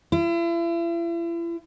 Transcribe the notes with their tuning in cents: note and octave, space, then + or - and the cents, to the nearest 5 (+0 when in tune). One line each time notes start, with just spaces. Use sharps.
E4 +40